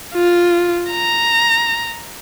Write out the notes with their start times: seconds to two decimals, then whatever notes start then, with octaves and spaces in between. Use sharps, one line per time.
0.15 F4
0.91 A#5